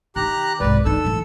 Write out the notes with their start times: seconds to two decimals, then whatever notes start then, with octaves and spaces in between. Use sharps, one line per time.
0.16 D#3 G4 A#5 F#6
0.60 C2 G#2 B4 D5
0.85 E2 D#4 A4 E6
1.05 A2 E3